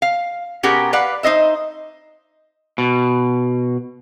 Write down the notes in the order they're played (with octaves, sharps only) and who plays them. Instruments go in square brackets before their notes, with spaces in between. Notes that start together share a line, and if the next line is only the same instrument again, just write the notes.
[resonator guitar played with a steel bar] F5
B2 C#4 G4 G#4 A#4 F#5
B4 D5 F5 F#5
D#4 C5 D#5 E5
[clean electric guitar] B2